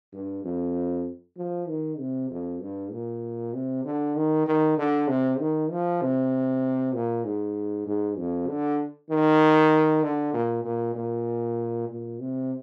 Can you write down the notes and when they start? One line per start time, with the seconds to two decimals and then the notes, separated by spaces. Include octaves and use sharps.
0.14 G2
0.44 F2
1.37 F3
1.69 D#3
1.99 C3
2.31 F2
2.62 G2
2.93 A#2
3.54 C3
3.85 D3
4.16 D#3
4.46 D#3
4.78 D3
5.08 C3
5.40 D#3
5.71 F3
6.02 C3
6.94 A#2
7.25 G#2
7.87 G#2
8.17 F2
8.48 D3
9.10 D#3
10.03 D3
10.34 A#2
10.65 A#2
10.95 A#2
11.89 A#2
12.20 C3